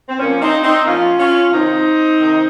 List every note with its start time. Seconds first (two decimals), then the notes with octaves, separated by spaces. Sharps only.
0.08 C4
0.20 A#2 F3 A#3 C#4
0.42 C4 D#4
0.64 C4 D#4
0.86 A#2 F3 C#4 F4
1.19 C#4 F4
1.52 C3 D#3 C4 D#4
2.18 C3 D#3